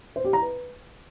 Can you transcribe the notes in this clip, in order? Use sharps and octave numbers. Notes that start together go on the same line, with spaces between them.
C5
G4
A#5
B4